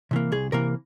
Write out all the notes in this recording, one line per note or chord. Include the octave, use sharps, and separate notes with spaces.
C3 E3 A#3
C2 G#4
C3 E3 A#3 A#4